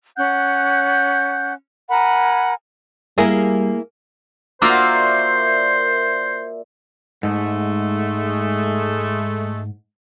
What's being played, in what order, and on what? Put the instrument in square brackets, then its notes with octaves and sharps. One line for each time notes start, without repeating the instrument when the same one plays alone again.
[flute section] C#4 F#5 F#6 G6
A#4 F#5 G#5 B5
[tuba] G3 [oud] A#3 G#4 [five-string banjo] E4 A#4
[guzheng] A#3 F4 F#4 [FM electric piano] A#4 D5 E5 [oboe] C5
[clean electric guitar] G#2 [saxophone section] G#3 A3